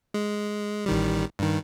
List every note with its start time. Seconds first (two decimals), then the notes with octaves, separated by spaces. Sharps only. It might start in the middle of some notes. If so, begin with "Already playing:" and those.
0.14 G#3
0.86 A1 D#3 G3
1.39 G2 D#3